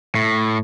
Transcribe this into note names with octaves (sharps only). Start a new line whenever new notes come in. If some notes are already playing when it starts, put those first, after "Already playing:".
A2